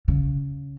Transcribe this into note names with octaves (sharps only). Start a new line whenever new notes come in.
C#3